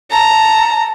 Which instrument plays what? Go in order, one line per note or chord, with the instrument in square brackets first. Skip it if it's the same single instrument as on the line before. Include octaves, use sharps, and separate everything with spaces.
[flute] A5 [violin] A#5